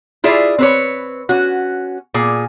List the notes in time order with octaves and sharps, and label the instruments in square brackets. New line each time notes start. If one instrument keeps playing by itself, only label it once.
[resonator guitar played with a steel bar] E4 F4 G#4 D5 E5
C4 B4 C#5
C#4 F#4
A#2 G#4 G#5